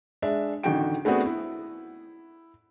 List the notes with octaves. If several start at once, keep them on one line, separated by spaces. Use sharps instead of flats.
G#3 D4 E5
A1 D3 D#3 F#4 G5 D7
A3 B3 C4 D4 F#4 G#4
E4